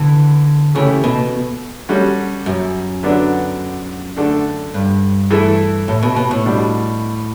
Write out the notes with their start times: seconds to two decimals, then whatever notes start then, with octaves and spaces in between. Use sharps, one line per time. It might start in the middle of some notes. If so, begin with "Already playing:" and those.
Already playing: D3 E3 B3
0.75 C#3 E3 A3 E4 G4
1.04 B2
1.89 G3 C#4 F#4 A4
2.46 F#2
3.03 D3 F#3 B3 D4
4.16 D3 A3 D4 A4
4.74 G2
5.30 E3 A3 E4 A4
5.88 A2
6.03 B2
6.16 B2
6.31 A2
6.44 B2 G3 D4